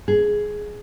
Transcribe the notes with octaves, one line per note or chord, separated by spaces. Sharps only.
G#4